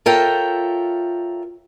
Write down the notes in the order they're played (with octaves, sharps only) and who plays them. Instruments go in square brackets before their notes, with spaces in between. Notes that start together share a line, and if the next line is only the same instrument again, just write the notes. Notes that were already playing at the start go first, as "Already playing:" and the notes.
[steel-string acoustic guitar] F4 A4 A#4 C#5 E5 G5